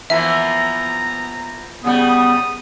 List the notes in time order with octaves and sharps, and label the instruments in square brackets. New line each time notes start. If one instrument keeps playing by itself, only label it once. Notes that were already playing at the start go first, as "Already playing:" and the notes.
[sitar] E3 F3 A#3 [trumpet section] B3 A#5 [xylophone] E5
[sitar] C#3 G3 [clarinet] B3 [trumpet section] D#6